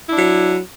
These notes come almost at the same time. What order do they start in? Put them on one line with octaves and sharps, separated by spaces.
E4 D4 F#3